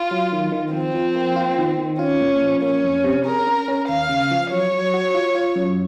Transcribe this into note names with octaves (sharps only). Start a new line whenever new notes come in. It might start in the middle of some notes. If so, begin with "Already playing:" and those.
Already playing: F4
F#3
D#3
D#3
F3 C4
F3
A#3
F4
D#3
D#3
C#4 F4
A#2
F3
A#3 C#4
F2
C3
G#4 A#4
C#4
C#4
D#2 F5
C#3
F3
F#3 C#5
F#3
F#4
F4
F4
F#2